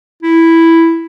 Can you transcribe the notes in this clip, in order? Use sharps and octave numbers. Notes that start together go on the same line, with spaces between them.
E4